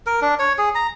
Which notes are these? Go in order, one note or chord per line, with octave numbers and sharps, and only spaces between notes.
A#4
D4
C#5
G#4
A#5